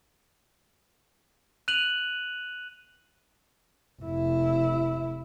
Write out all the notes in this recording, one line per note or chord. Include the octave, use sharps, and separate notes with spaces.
F#6 D#7 F7 F#7
F1 E4